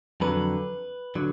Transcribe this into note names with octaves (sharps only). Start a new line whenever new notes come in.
F2 D3 F#3 B4
D3 F#3